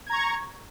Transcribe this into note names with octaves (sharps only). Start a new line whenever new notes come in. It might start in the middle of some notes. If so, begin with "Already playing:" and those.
A#5 C#6 G#6